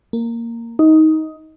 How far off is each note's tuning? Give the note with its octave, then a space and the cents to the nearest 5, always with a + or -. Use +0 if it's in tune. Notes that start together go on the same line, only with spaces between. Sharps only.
A#3 -10
D#4 +15